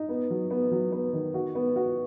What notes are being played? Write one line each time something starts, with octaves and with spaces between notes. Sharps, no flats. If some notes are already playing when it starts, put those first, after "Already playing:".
Already playing: D#4
B3
F#3
B3
F#3
B3
D#3
F#4
B3
F#4